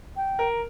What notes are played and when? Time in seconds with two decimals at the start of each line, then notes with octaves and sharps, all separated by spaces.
0.16 G5
0.39 A#4